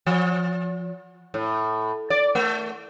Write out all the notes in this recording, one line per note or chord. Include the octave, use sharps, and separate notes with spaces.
F3
A2
D5
A3